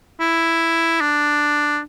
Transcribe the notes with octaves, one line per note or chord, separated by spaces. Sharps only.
E4
D4